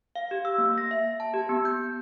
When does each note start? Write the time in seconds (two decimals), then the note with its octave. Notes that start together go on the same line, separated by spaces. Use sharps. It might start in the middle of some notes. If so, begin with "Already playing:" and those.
0.15 F5
0.31 G4
0.45 E6
0.58 A#3
0.78 A#6
0.91 E5
1.20 A5
1.34 G4
1.49 B3
1.65 G6